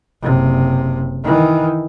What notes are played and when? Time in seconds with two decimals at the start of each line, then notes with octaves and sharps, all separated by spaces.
0.22 F#1 C3
1.24 D#3 E3